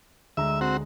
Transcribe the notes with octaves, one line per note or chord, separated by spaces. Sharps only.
D2 G#3 E5 A#5
C4 F#4